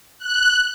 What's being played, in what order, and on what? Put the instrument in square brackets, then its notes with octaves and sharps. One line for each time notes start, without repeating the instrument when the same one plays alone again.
[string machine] F#6